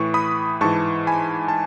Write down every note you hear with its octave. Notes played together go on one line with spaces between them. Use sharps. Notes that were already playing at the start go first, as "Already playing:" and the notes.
Already playing: A2 E3 C#6
B5 D#6
G#2 E3 A5 C#6
G#5 B5
A5